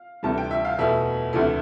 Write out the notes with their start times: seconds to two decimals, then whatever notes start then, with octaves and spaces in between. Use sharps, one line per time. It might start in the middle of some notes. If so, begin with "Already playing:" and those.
Already playing: F5
0.23 D2 C3 E3 G3 A5
0.38 G5
0.51 E5
0.65 F5
0.78 E2 B2 A3 E5
1.33 D2 C3 E3 A3